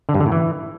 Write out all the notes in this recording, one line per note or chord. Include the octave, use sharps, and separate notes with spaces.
D3
G2
D3
A2
E3